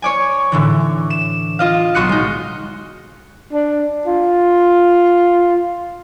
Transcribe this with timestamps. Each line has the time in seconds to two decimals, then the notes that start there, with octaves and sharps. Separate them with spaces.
0.02 C#5 D5 G#5
0.52 A2 D3 E3
1.10 E7
1.59 F4 D#5 F5
1.95 B1 F#4 C6 D#6 F#6 C#7
2.09 G#3 D#4
3.53 D4
4.07 F4